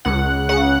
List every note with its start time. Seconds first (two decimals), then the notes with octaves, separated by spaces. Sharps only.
0.05 C#2 F#5
0.49 C#3 F#5